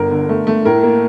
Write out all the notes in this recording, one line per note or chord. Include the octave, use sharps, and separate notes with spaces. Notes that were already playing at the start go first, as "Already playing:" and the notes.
Already playing: G1 A#4
D3
A3
A3
A2 A#4
A#3